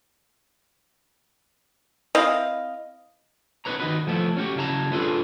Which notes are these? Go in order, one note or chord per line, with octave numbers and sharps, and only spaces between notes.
C4 E4 D#5 F5
C4 D#4 F4 B4 C#5 A#5
D#3 D#4 F#4 B4
F3 A3 B3 E4
C#4 F#4 G4
C#3 F#3 E4 A5 A#5
B3 D4 F4 G#4 A4 B4